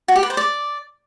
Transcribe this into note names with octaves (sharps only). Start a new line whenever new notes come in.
F#4
G4
B4
C5
D5